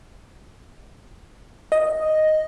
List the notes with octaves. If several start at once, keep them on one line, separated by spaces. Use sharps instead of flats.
D#5